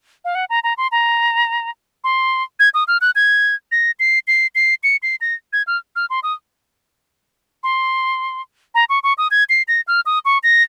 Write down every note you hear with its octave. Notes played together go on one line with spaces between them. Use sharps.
F5
F#5
A#5
A#5
C6
A#5
C6
G#6
D#6
F6
F#6
G#6
A#6
C7
C7
C7
C#7
C7
A#6
G#6
F6
F6
C6
D#6
C6
A#5
C#6
C#6
D#6
G#6
C7
A#6
F6
D#6
C#6
A#6